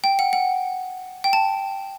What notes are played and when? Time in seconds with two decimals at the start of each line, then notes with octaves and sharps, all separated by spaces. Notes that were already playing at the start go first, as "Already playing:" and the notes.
0.04 G5
0.19 F#5
0.33 F#5
1.24 G5
1.33 A5